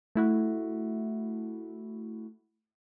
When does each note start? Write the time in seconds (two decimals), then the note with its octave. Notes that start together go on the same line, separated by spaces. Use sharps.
0.15 A3 E4 F#4